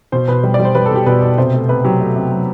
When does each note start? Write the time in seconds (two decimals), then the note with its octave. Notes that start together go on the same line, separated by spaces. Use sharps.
0.12 B2 C5
0.28 B2 B4
0.44 G3
0.54 D5
0.60 G3
0.65 C5
0.75 G3 B4
0.86 A4
0.91 B2 G4
1.06 B2 B4
1.22 B2
1.38 C3 C5
1.53 A3
1.69 C3 B4
1.85 F#3 G4
2.00 A3
2.16 C3
2.31 F#3